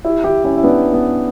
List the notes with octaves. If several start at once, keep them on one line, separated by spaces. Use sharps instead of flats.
E4 G4
E4 G4
C#4 E4
E4
B3 D4
B3